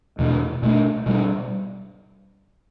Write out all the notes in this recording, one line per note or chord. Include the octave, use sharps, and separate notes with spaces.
E2 B2 A3 D4
B2 A3 D4
B2 G3 D4